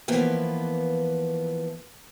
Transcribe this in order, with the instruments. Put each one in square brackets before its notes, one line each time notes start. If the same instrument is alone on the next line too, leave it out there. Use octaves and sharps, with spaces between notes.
[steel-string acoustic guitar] E3 F3 A#3 B3